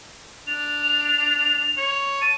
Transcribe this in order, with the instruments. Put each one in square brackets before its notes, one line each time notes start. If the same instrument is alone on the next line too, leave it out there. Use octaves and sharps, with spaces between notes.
[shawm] D4 [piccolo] F7
[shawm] C#5
[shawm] A5 [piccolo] D#7